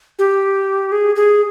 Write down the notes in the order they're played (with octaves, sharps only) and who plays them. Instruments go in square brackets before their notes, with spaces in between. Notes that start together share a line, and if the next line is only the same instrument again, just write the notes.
[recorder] G4
G#4
G#4